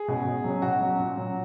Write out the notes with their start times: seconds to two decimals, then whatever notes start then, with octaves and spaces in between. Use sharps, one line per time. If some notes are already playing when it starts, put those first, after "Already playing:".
Already playing: G#4
0.08 B2 G#3 C#4
0.26 B2
0.44 F#3 C#4
0.62 B2 F#4
0.81 F#3 C#4
0.99 A#2
1.17 F#3 C#4